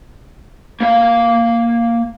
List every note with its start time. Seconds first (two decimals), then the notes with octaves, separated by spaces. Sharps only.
0.80 A#3 F5